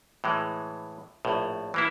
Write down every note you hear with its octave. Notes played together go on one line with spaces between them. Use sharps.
A2 E3 G#3
A#1 A2
E3 A#3 E4